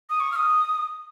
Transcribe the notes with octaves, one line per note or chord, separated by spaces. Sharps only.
D#6
C#6
F6
D#6